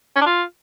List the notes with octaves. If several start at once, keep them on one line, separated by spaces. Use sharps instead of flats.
C#4
D4
F4